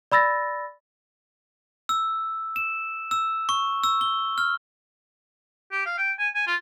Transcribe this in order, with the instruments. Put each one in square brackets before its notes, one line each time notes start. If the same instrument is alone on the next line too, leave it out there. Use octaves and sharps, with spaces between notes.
[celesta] D5 B5 E6 A6 A#6
[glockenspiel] E6
E7
E6
C#6
E6
G7
F6
[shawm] G4
F5
G5
G#5
G#5
F4